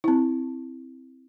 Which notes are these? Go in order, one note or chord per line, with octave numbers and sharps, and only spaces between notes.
C4 E4